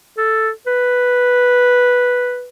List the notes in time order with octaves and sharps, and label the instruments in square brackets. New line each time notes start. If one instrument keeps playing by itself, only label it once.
[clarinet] A4
B4